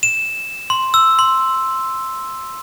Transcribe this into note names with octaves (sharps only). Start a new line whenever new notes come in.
E7
C6
E6
C6